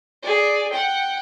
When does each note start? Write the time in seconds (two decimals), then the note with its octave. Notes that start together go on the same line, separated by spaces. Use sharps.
0.23 G#4 D5
0.71 F#5 G5